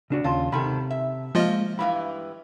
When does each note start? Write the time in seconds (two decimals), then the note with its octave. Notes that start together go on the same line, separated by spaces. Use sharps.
0.10 C#3 D4 F#4
0.24 D#2 C#3 F4 A5
0.52 G#2 C3 D#3 A4 B5
0.91 E5
1.35 F3 G#3 A#3 F4 D#5 F5
1.79 G2 E3 F5 B5